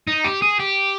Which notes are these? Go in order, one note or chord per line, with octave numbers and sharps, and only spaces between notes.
D#4
G4
G#4
G4